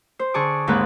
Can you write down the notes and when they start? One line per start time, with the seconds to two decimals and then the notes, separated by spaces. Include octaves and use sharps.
0.19 C5
0.34 D3 G#4 A5 C#6 D6
0.67 D#2 G#2 C4 B4 F#6